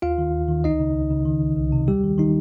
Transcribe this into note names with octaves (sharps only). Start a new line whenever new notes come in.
D#2 F4 F5
D#3
D#2
D#3
C#2 D#4 D#5
C#3
C#2
C#3
D#3
C2
C2
C3
D#2 G3 G4
D#3
D#3 D#4